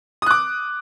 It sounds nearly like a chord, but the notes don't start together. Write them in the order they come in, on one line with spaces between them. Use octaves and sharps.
D#6 F#6 D6